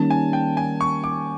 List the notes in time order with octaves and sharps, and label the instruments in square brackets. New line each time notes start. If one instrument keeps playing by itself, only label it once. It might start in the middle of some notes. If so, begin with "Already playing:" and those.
Already playing: [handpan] D#3 G3 A#3 C#4 [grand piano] A5
[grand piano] G#5
G5
G#5
C#6
D6